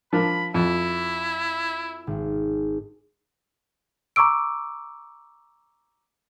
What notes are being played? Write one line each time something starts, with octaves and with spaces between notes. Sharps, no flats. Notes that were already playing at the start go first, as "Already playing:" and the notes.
F3 D4 A#4 B5
F2 E4
G#1
A#5 C#6 D6 E6 D7